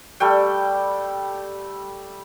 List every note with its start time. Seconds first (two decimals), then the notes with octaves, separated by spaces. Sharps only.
0.20 G3 A3 F#5 G5